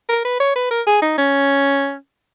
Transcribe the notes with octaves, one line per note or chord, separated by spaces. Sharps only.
A#4
B4
C#5
B4
A#4
G#4
D#4
C#4